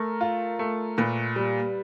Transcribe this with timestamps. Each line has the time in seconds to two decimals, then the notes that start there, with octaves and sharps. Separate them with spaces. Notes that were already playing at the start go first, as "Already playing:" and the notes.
Already playing: A3 A#4
0.21 F4
0.59 A3
0.98 A#2 B4
1.36 G3